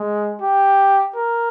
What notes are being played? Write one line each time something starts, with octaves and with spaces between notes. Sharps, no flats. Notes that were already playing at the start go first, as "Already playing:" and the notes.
Already playing: G#3
G4
A#4